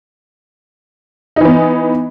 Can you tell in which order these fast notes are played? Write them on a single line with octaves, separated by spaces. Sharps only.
D#4 E3 B3